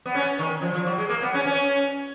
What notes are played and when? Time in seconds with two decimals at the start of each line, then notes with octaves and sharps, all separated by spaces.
0.06 B3
0.15 C#4
0.39 D#3
0.62 F3
0.74 F3
0.87 F#3
0.98 G#3
1.09 A#3
1.22 B3
1.34 C#4
1.46 C#4